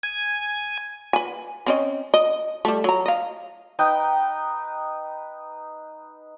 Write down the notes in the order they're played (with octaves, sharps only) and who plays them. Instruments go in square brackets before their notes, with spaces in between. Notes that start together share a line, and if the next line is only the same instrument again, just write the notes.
[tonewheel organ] G#5
[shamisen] B4 G#5
C4 C#4 D#5
D#5
G3 A3
F#3 A#5
D#5 F5
[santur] D#4 B4 G5